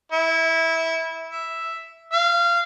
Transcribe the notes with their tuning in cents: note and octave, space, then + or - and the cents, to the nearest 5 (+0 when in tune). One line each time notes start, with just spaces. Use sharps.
E4 -15
E5 +0
F5 -20